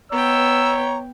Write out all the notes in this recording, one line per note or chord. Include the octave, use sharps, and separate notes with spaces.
B3 C#5 G5 A#5 E6